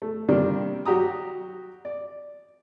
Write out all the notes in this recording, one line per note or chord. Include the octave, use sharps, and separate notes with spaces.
A3
C3 D#3 G3 A#3 D4
F#3 F#4 G4 A#5 D#6
D5